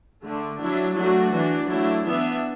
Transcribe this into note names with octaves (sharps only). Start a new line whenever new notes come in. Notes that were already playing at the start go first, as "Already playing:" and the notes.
D3 A3 D4
F#3 D4 E4
F#3 A3 D4 F#4
E3 D4
F#3 A3 D4 E4
E3 B3 D4 E5